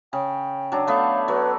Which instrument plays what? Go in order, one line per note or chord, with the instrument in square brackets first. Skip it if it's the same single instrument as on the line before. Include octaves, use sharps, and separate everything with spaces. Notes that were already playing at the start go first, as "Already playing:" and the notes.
[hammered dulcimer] C#3 [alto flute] G5
[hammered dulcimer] F#3 D4
[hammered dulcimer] A3 B3 [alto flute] F5
[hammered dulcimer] F#3 [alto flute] B4